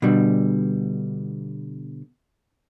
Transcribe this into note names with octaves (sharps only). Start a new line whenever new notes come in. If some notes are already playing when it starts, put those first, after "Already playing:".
B2 D3 G3